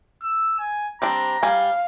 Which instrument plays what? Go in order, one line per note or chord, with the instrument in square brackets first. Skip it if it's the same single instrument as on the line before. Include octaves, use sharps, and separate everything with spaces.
[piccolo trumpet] E6
G#5
[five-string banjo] G3 C4 D4 [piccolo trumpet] A#5
[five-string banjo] G3 G#5 [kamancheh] F5